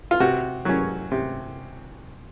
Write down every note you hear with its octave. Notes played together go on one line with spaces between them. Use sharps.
F4
C3 F#4
F#3 C#4
C3